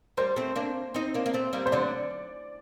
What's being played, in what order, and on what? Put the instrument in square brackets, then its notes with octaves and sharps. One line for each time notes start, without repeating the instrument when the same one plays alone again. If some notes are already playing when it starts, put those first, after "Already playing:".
[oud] G3 A#3 [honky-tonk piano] C5
[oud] A3 C4
A#3 D4
C4 D#4
A#3 D4
A#3
A3 C4
G3 A#3
[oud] G3 [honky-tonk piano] C5
[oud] D3 F#3 [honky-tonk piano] D5